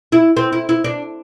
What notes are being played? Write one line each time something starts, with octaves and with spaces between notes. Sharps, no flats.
E4
C4
E4
E4
D4